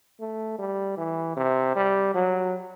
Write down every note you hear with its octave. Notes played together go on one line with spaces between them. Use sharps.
A3
G3
E3
C3
G3
F#3